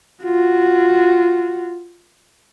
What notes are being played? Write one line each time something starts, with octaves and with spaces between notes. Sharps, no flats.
F4 F#4